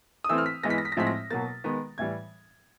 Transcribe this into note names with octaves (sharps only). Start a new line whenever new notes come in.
D#6
E3 A3 C4 E6
F6
B6
E3 G#3 B3 A#6
B6
A#6
B6
A#6
A2 F3 G#3 C4 B6
A#6
B2 F#3 A#3 A6
D#3 G#3 B3
A2 E3 G3 G#6